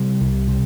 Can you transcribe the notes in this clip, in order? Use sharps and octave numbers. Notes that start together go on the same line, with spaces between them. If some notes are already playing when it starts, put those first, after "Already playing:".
Already playing: C3 G3
C2
C3